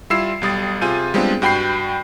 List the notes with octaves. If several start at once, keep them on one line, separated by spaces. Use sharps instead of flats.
G3 E4 F4 E6 C7 E7
B1 G3 D#6 A6
C3 F4 G#4 G#5 G6 D#7
G3 G#3 B3 C4 D4 F4
G2 F#4 G5 B5 G6 C7